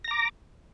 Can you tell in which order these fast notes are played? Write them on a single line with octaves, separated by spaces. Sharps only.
A#6 A#5 D6